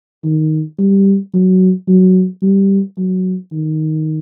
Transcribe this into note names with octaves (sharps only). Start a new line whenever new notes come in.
D#3
G3
F#3
F#3
G3
F#3
D#3